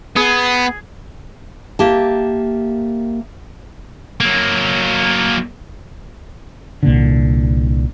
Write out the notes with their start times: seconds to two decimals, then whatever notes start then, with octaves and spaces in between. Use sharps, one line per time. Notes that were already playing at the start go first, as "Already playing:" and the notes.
0.16 B3 G#4
1.79 A#3 G4 E5 A5
4.21 F#3 A#3
6.83 C2 A#2 D3